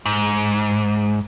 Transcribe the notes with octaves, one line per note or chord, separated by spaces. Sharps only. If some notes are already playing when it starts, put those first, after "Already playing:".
G#2